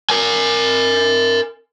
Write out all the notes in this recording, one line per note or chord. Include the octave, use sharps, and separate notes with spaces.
A#4 G#5